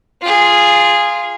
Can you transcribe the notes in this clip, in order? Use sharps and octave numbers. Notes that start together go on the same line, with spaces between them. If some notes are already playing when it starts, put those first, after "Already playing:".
F4 G#4